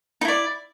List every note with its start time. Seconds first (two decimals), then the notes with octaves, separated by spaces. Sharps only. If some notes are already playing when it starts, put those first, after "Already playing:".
0.21 D#4
0.25 E4
0.28 D5